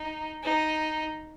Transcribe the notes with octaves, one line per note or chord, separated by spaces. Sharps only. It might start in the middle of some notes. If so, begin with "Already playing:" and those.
Already playing: D#4
D#4